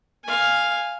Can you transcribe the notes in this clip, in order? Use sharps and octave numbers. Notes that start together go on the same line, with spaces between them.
F5 G#5